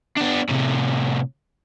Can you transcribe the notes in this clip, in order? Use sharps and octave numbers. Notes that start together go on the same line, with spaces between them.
B3 D4
A2 C3